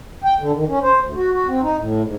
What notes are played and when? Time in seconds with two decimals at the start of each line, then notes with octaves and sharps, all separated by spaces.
0.24 G5
0.40 D3
0.54 D#3
0.69 C#4
0.82 C5
1.01 D2
1.15 F#4
1.32 F#4
1.48 C4
1.62 D#4
1.77 A2
2.03 G#2